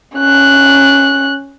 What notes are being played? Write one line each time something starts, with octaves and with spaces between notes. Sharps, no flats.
C#4 F#6